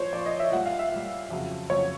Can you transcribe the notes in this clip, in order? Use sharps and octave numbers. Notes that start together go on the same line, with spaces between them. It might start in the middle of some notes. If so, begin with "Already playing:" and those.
Already playing: A#2 F3 C5 C#5
A#2 F3 D5
D#5
E5
A#2 G3 F#5
F5
E5
A#2
G3
F2 C#3 F#3
F2 C#3 F#3 C#5